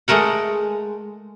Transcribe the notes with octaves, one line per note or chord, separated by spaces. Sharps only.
G#3 A3 A#4 F#5